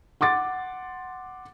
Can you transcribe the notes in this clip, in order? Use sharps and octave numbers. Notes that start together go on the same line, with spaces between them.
F#5 C6 D6 A6